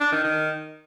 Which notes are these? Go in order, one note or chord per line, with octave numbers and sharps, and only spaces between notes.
D4
D#3
D#3